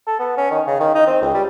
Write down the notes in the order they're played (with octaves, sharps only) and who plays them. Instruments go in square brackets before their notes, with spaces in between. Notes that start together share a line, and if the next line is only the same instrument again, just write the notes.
[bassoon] A4
B3
C#4
D#3
C#3
D#3
D#4
C4
C#2
G3